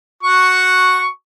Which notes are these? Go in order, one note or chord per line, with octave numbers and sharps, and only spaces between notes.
F#4 C#6